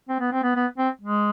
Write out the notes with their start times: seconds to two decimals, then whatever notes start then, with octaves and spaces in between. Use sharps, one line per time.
0.09 C4
0.20 B3
0.32 C4
0.43 B3
0.55 B3
0.78 C4
1.01 G#3